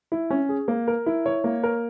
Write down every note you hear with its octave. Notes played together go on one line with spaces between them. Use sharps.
E4
C#4
G#4
A#3
A#4
E4
C#5
A#3
A#4